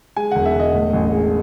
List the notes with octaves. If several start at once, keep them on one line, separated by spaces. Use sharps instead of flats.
G#3 G#5
E1 F#5
E5
E1 D#5
A2
A1
G#3